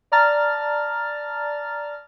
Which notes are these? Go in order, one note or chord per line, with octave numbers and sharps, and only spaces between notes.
D5 A5 A#5 F6 A6